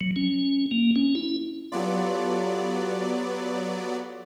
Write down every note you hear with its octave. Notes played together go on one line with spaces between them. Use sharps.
F#3
C#4
A#3
C#4
E4
F#3 B3 F4 G4 A4 D5